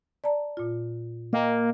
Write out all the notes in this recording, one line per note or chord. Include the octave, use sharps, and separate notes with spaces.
D5 A5 A#5
A#2 F4
A#3 D#5 G5